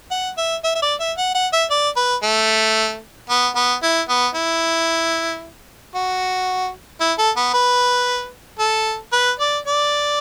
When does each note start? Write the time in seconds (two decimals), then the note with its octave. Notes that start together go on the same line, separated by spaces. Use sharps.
0.11 F#5
0.37 E5
0.64 E5
0.75 E5
0.82 D5
1.00 E5
1.17 F#5
1.35 F#5
1.53 E5
1.71 D5
1.96 B4
2.23 A3
3.30 B3
3.56 B3
3.83 E4
4.09 B3
4.35 E4
5.95 F#4
7.00 E4
7.18 A4
7.36 B3
7.54 B4
8.59 A4
9.12 B4
9.39 D5
9.66 D5